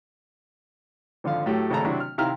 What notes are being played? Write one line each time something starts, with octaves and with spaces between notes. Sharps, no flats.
G#1 D3 F3 F5
A2 F#3 A3 G4
G#1 C#3 A3 A5 A#5
C3 F#3 D4 E4 F#4
F6
C3 D#3 E4 F5 A#5 F6